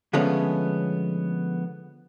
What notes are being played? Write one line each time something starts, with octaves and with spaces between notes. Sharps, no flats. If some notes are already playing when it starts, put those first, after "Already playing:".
D3 F3 G#3 A3 B3 C#4